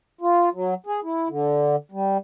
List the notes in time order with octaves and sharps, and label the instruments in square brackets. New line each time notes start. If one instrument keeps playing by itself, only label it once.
[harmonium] F4
F#3
G#4
E4
D3
G3